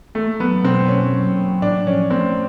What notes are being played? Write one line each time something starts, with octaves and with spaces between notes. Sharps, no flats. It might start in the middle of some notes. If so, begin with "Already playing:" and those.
A3 A#3
F#3 B3
B2 C4
A#3 C#4
F#3
F#3
A2 D4
F3 C#4
A3 C4